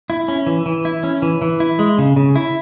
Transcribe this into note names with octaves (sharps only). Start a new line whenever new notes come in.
E4
C#4
E3
E3
E4
C#4
E3
E3
E4
G#3
C#3
C#3
E4